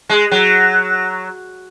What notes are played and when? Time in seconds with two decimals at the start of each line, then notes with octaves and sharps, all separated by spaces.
0.09 G#3
0.31 F#3